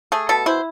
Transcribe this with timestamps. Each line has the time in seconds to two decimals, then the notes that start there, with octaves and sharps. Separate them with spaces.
0.12 A3 G#4
0.29 B2 A4
0.46 E4 C5